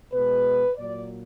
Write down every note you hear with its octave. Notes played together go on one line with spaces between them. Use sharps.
B2 G#3 B4
A#2 F#3 D5